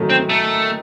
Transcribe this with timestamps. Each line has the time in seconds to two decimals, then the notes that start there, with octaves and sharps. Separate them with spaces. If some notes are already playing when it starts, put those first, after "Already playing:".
Already playing: D#3 E3 F#3 A3
0.10 C4
0.29 A3